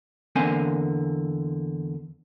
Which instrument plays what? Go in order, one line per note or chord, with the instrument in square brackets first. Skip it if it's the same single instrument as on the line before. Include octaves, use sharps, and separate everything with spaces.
[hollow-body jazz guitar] E2 D3 A#3 C4 G#5